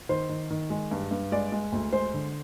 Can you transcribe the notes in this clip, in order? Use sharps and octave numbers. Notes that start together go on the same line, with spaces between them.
D#3 C5
D#3
D#3
G#3
G2
G2
G#3 D5
G#3
D2
G#3 C5
D3